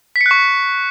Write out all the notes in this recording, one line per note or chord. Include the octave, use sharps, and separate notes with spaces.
B6
C#7
F#6
C#6